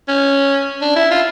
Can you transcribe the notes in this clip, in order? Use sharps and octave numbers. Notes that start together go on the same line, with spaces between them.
C#4
D4
E4
F4